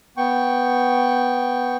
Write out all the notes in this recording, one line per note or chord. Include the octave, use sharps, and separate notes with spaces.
B3 G5 C#6